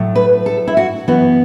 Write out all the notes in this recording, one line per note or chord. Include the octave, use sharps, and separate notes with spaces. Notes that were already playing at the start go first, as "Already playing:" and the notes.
Already playing: A2 F#3 A3
B4
A4
E4
F#4
F#2 E3 B3 F#4